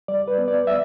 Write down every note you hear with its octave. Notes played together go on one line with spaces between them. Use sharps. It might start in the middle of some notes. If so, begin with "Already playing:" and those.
G3 D5
B4
B3
D5
G3 E5